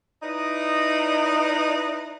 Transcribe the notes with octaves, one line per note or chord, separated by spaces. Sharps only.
D#4 E4 B4 D5 D#5